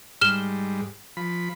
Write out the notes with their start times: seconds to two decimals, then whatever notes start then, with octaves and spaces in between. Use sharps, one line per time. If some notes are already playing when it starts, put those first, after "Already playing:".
0.21 G#2 G3 F6 E7 G7
1.17 F3 B5